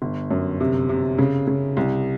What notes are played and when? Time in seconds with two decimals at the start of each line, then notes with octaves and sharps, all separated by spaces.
0.02 G1
0.31 F#2
0.60 C3
0.89 C3
1.18 C#3
1.47 C#3
1.77 C2